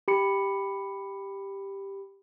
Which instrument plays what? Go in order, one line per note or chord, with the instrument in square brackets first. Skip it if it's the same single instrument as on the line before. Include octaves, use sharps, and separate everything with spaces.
[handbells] G4 B5 C#7